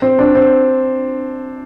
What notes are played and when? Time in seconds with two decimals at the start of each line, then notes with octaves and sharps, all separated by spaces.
0.02 C4
0.19 D4
0.35 C4